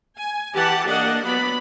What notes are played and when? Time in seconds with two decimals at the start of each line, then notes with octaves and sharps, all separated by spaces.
0.18 G#5
0.55 E3 G4 F#5 A5
0.87 A#3 D4 D#5 F#5
1.24 F#3 B3 D5 B5